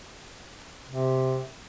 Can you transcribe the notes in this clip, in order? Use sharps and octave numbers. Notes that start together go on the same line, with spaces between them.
C3